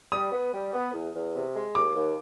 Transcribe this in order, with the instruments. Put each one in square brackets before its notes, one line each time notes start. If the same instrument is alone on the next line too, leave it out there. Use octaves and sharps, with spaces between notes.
[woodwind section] G3 [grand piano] D#6
[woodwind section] B3
G3
B3
E2
E2
C3
G#3
[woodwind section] D#2 [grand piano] D6
[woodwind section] D#2